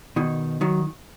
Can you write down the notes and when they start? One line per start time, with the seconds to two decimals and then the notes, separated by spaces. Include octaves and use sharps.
0.16 B2 D#3
0.61 D#3 F#3